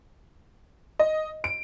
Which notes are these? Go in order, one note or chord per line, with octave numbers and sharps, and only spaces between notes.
D#5
D7